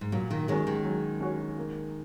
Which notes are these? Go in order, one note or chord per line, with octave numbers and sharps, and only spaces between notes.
G#2
A#2 F#3
A#2 D#3
D#3 G#3 C#4 F#4 C#5
D#3 G#3
F#3
C#4 F#4 C#5
A#3